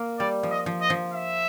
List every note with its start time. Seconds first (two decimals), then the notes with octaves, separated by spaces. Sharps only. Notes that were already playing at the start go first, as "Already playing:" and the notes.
Already playing: A#3
0.19 G3 D5
0.43 F3
0.50 D#5
0.66 F3
0.82 D#5
0.90 F3
1.13 E5